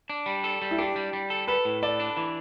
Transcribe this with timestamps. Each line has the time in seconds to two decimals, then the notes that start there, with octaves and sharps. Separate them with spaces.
0.10 D4
0.26 G3
0.44 A4
0.62 G3
0.71 E4
0.78 D4 G4
0.96 G3
1.13 G3
1.30 A4
1.47 A4 B4
1.65 A2
1.83 A4 D5
2.00 D4
2.17 E3